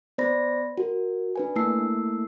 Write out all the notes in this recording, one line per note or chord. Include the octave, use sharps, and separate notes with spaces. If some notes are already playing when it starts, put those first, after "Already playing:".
B3 C5 D5 B5 A#6
F#4 A#4
D4 B4 G#5
A3 A#3 E4 A5 E6 C7